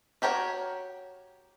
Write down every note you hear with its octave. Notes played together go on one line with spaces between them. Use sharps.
F#4 G4 A#4 C#5 G5